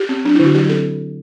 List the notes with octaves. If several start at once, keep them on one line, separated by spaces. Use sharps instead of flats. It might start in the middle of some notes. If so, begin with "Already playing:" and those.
Already playing: G4
C4
F#3 D4
D3 E4
F#4
F#3 G4
C4 A4